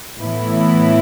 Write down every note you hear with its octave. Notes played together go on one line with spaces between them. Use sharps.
A2 E3 B3 E4